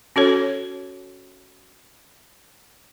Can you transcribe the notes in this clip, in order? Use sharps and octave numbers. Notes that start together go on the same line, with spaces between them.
C#4 F#4 A4 C#5